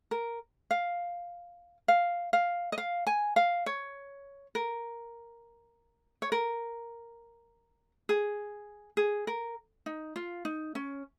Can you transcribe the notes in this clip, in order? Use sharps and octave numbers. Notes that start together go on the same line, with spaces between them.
A#4
F5
F5
F5
D#5
F5
G#5
F5
C#5
A#4
C#5
A#4
G#4
G#4
A#4
D#4
F4
D#4
C#4